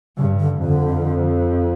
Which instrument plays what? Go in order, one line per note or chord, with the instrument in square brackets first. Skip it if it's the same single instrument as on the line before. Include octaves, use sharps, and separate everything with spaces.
[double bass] G2 [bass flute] C#3
[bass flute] D3
[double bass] F2 [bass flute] D3